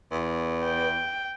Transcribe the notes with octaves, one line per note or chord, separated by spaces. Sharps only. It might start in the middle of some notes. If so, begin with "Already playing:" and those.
E2
G5